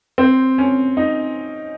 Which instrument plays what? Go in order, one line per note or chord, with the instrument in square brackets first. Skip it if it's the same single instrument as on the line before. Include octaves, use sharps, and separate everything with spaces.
[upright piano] C4
C#4
D#4